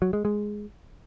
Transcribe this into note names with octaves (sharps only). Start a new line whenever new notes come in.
F#3
G#3
G#3